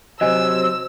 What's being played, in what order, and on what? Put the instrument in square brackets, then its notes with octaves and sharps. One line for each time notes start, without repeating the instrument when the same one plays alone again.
[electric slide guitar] C3 F#3 [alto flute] C5 [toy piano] D#5 G#5 [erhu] E6